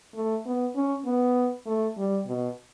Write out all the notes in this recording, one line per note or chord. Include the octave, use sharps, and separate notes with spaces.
A3
B3
C#4
B3
A3
G3
B2